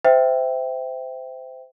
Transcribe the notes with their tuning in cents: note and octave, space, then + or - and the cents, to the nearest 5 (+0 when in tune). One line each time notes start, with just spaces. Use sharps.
C5 -20 E5 +0 G5 +0